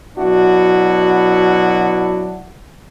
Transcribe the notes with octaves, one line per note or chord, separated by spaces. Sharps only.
B2 F#3 D4 E4 F#4